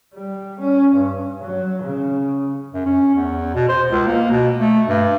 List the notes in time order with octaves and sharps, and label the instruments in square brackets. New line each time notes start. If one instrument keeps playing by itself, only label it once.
[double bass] G3
C#4
G2
F#3
C#3
[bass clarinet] F#2
C#4
E2
B2
C5
C#2
A#3
B2
A3
G2